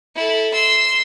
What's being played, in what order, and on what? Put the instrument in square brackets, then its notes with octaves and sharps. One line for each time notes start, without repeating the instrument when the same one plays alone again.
[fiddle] E4 A4
C6 E6